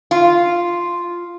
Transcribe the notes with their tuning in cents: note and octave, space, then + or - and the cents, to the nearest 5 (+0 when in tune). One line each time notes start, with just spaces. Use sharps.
F4 -5